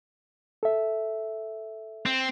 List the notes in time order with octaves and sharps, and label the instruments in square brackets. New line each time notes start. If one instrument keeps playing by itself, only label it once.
[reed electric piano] A4 E5
[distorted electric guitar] C4